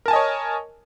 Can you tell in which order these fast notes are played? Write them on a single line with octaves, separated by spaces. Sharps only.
A#4 A5 G#5 D#5 C#5